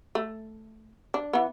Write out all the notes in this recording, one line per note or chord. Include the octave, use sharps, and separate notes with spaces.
A3
D4
E3 B3